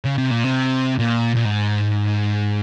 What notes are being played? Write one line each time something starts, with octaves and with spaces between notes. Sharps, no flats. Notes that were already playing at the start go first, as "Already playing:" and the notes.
C#3
C3
A#2
C3
A#2
A#2
G#2